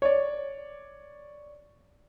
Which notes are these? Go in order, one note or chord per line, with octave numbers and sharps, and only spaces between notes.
C#5 D5